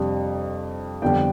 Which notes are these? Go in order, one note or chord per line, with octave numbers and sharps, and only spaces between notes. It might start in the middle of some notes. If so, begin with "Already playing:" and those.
Already playing: F2 C3 G3 D4
F2 D3 G3 B3 D4 G5